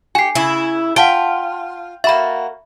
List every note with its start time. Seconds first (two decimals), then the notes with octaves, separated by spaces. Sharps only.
0.15 F#4 G4 G#5 C7
0.35 C#3 E4
0.96 F4 F#5 G5 A5 D7
2.04 A#3 F#4 E5 B5